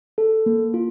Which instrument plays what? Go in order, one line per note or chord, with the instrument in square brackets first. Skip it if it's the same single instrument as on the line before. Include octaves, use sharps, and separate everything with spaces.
[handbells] A4
A#3
F4